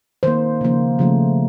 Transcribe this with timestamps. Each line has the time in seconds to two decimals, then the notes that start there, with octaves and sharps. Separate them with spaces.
0.23 D#3 A#3 C5
0.61 C#3 F3 A#3
0.99 C#3 F3 A3